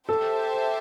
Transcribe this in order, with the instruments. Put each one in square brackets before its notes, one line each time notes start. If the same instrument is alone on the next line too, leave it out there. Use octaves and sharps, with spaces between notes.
[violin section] G4 C5 E5 A5 [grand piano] A4